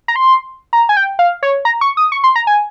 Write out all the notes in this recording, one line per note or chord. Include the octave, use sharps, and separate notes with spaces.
A#5
C6
A#5
G#5
G5
F5
C#5
A#5
C#6
D#6
C#6
C6
A#5
G#5